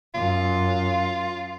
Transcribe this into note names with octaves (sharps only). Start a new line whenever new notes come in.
F#2 F4